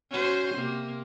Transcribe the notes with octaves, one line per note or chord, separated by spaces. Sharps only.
C#4 F#4 C5
C3 A#3